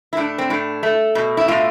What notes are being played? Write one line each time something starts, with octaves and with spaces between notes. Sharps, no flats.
E4
A2 D4
C4
A2 D4
A3
B2
E4
A2 F4